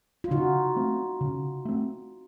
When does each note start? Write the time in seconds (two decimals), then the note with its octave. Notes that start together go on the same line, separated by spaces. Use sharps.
0.24 F4
0.31 C#3 D#4 F#4
0.76 A3 C4
1.21 C#3
1.65 A3 C4